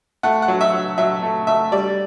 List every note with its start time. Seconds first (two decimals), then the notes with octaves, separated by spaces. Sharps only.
0.23 A3 F#5
0.42 F#5
0.48 F#3
0.61 E5
0.73 F#3
0.98 F#3 E5
1.23 A3
1.47 A3 E5
1.72 G3 D5